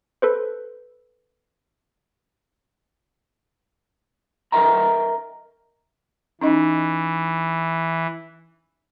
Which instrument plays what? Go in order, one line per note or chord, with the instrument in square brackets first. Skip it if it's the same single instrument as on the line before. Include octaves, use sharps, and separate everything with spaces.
[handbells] A4 B4 C5
[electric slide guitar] A#4 B4 D#5 E5 G5 A#5
[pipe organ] E3 [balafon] C#4 D#4 D#5